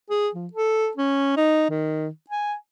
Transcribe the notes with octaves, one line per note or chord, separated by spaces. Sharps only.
G#4
F3
A4
C#4
D#4
D#3
G#5